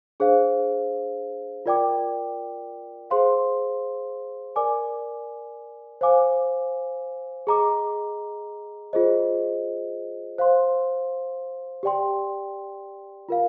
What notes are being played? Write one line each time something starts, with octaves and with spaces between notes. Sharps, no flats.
D4 G#4 C5 F5
F4 A#4 D5 G5 D6
G#4 C5 F5 C6
A#4 D5 G#5 D6
C5 F5 G#5 D6
G#4 D#5 A#5 D6
F4 G#4 C5 D#5
C5 F5 C6
G4 D5 G5 C6
F4 A#4 F5